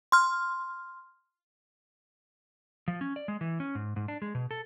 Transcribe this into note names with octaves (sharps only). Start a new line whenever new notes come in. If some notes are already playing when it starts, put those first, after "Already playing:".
C6 F6
F3
C#4
D5
G#3
E3
C#4
G#2
G#2
D4
G#3
B2
A4